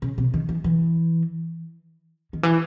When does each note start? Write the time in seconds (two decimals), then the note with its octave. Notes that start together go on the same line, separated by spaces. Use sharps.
0.02 C#3
0.18 C3
0.34 D#3
0.49 E3
0.64 E3
2.33 D#3
2.43 E3